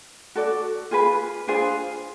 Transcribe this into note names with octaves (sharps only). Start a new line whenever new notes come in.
F#4 A4 D5
F4 G#4 B4
D4 F4 G#4 C5